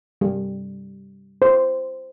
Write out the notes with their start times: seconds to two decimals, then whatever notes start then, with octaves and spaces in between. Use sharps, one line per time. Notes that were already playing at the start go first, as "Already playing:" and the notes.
0.21 G3
1.42 C5